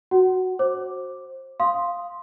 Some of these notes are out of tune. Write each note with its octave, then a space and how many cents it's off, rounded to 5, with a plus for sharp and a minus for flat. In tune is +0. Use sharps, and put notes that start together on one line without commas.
F#4 +0 F#5 +20
C5 +20 D6 +0
F5 +0 C6 +0 D#6 +0